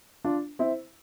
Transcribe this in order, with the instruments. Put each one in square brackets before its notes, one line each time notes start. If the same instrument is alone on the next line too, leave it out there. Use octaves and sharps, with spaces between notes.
[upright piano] D4 F4
C4 E4